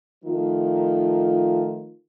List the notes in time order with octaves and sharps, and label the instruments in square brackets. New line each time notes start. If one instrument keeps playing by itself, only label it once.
[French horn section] D#3 F3 A3 F4